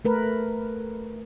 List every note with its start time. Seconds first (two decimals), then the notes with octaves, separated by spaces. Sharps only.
0.05 A3 A#4 B4